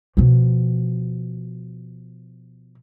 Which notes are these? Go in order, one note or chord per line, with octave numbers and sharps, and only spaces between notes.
B2 F3